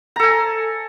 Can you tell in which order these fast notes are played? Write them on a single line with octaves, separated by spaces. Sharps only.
A#5 A4 G#5